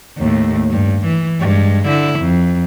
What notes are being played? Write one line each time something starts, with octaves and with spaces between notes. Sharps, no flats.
D#2 A2
G2
E3
G2 G#3
D3 E4
F2